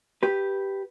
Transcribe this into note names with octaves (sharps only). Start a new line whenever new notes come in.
G4 B4